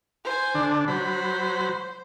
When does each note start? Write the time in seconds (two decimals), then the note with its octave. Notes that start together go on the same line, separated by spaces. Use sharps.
0.25 C5 G#5
0.55 D3 D4
0.88 F#3 C5 B5